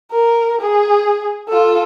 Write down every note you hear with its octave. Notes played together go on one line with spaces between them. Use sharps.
A#4
G#4
F4 A4